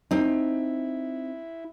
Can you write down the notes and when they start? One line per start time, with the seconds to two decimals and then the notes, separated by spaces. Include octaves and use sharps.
0.11 C4 D#4 E4